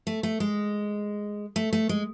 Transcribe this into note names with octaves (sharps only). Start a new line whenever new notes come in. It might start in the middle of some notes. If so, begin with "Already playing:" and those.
A3
A3
G#3
A3
A3
G#3